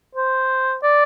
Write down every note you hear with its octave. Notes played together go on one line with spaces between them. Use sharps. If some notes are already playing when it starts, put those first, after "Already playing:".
C5
D5